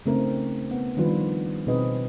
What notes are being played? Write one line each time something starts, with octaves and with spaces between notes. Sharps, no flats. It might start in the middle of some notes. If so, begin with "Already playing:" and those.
C#3 A3 C4 D#4 A#4
B3
D#3 F3 G3 D4 F4 B4
B2 C4 D#4 G#4 B4 D#5